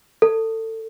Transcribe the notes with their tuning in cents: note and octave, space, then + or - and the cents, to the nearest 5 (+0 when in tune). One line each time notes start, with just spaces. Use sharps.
A4 +25